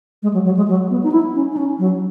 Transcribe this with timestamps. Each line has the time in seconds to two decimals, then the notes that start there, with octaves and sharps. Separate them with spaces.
0.23 G#3
0.34 F#3
0.45 F#3
0.57 G#3
0.68 F#3
0.90 B3
1.03 D#4
1.12 E4
1.35 C#4
1.52 D#4
1.57 C#4
1.79 F#3